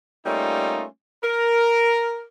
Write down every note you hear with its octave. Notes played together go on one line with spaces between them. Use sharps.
G3 A3 A#3 C#4 D#4 F4
A#4